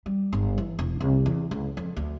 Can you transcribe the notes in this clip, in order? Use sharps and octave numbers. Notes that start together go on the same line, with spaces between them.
G3
G1
E3
E1
C2
E2
C#2
F2
D2